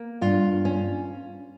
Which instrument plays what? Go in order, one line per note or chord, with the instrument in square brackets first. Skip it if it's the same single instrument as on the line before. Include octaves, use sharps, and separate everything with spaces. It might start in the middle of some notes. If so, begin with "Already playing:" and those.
Already playing: [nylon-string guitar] A#3
G2 F4
C#4